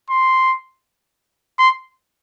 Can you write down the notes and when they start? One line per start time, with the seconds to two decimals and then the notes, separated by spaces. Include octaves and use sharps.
0.10 C6
1.59 C6